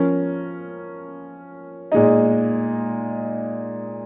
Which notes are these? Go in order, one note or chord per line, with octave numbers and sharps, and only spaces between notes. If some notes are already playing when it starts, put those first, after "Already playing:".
Already playing: F3 C#4 A#4
A#2 G#3 D#4